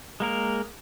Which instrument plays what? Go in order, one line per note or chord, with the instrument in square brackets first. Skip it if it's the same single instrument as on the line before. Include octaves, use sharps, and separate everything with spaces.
[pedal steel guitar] G#3 A#3 A#4